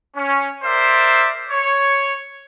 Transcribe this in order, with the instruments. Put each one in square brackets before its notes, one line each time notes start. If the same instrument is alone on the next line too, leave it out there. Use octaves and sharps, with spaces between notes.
[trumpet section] C#4
A#4 C5 D5 E5
C#5